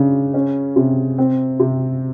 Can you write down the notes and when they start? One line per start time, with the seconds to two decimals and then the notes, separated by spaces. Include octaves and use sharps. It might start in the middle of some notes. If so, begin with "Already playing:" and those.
Already playing: C#3 D4
0.34 C#4
0.76 C3
1.18 C4
1.60 C3